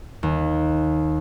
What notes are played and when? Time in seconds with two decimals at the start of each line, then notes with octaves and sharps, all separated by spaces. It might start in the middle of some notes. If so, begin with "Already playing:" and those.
0.23 D#2